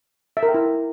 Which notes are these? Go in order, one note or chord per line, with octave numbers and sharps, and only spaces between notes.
E5
A#4
G5
E4